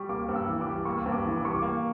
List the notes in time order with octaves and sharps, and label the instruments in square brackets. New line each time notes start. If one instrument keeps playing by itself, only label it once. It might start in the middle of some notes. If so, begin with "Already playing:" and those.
Already playing: [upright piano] G3 [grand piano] C#6
[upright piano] A#3 [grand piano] D6
[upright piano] G2
[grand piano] E6
[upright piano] E3
[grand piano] D6
[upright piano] G3
[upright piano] A#3 [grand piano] C#6
[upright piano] G2
[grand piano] D6
[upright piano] E3
[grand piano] D6
[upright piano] G3 [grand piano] C#6
[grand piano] D6
[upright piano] A#3